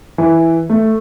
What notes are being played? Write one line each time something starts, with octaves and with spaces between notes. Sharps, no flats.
E3
A3